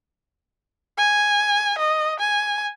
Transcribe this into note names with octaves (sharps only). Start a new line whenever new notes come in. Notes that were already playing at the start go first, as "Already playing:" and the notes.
G#5
D#5
G#5